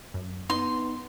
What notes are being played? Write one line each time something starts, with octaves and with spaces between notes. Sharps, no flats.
F#2
B3 D#4 C6